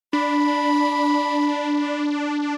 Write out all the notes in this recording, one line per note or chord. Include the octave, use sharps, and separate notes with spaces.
D4 B5